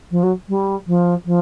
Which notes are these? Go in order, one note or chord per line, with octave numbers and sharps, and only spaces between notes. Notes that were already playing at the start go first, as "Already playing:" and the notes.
F3
F#3
G3
F3
F3